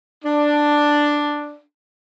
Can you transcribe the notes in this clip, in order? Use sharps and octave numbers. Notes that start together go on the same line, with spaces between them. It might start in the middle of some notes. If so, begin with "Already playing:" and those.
D4